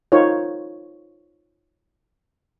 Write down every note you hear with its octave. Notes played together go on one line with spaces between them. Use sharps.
D#4 F4 A#4 C5 C#5